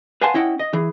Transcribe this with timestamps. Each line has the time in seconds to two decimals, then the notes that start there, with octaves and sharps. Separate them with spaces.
0.21 B4 F5 F#5 G#5 A5 C6
0.34 C#4 E4 D#5 F#5 G5
0.59 D#5
0.73 E3 G#4